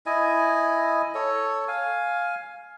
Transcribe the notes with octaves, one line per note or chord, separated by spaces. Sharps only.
E4 D#5 G#5
A4 C#5
F5 G#5